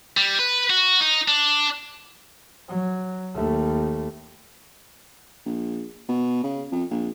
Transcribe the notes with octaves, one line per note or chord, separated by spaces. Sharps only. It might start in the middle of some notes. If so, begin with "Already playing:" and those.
G3
B4
F#4
D#4
D4
F#3
D#2 A3
A#1
B2
C#3
F2
A#1